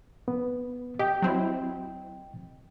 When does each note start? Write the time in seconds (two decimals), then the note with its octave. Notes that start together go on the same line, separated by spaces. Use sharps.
0.28 B3
0.99 G4 D#5 G5
1.22 F#3 C4 E4